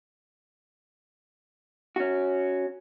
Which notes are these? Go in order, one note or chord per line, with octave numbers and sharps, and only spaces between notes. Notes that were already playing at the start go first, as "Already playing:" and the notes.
C#4 F#4